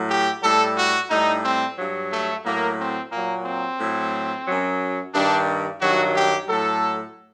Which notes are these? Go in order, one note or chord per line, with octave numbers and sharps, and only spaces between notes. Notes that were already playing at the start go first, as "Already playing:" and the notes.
Already playing: A2 F#3
G4
A2 G3 A4
F#4
A2 G3 D#4
C4
G2 F#3
A3
A2 F#3 A#3
C4
A#2 F#3 A#3
C4
A2 F#3
F#2 F#3
G2 D#3 G3 D4
G2 D#3 F#3 F#4
G4
A2 F#3 A4